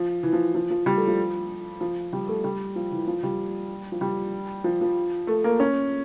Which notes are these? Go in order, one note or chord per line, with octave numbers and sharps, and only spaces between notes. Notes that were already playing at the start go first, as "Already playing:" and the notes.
Already playing: F3
E3
F3
F3
F3
G3
A3
F3
F3
G3
A3
G3
F3
E3
F3
G3
F3
G3
F3
F3
A3
A#3
C#4